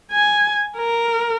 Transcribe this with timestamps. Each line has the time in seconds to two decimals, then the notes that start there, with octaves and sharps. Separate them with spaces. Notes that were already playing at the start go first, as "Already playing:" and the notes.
0.12 G#5
0.77 A#4